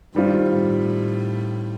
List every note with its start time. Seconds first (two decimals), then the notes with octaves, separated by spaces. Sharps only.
0.15 G2 D#3 G3 C4 F4
0.53 A2